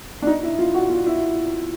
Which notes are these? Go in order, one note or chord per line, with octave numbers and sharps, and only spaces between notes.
D4
D#4
E4
F4
F#4
F4
E4